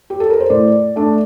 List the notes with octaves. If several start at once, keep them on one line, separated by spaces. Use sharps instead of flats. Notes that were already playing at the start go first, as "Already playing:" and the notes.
G4
A4
A#4
C5
A2 D5
A3 D4